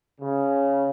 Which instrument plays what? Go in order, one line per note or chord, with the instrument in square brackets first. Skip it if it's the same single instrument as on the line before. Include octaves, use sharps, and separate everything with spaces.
[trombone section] C#3